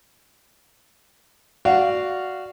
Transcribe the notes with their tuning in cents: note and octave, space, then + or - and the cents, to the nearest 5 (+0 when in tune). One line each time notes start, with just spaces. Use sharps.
F#4 +0 D5 +0 F5 -10